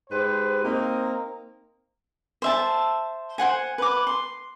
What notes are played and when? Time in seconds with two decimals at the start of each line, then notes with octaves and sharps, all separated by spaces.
0.10 G#2 G4 B4 C5
0.63 A#3 C4 D#4
2.42 C5 E5 A5
3.38 C5 F#5 G#5
3.78 B4 D6
4.07 C6